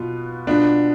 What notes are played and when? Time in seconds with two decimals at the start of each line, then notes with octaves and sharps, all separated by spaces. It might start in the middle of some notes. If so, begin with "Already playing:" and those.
Already playing: B2 B3 F4
0.47 B2 B3 D4 F4